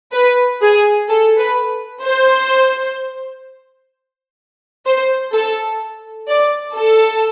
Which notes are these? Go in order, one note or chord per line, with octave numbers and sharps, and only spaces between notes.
B4
G#4
A4
B4
C5
C5
A4
D5
A4